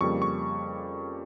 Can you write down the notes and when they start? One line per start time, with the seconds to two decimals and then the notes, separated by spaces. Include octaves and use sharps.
0.01 F2 C#3 G3 A#3 C#6
0.22 C#6